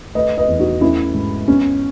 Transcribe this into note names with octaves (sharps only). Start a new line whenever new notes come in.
A3 B4 D#5
B4 D#5
E2
D#4 F#4
A3 C#4 E4
G#2
B3 C#4